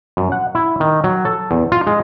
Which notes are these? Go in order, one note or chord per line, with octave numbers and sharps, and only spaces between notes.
F#2
F#5
E4
D#3
F#3
A4
E2
F4
G#3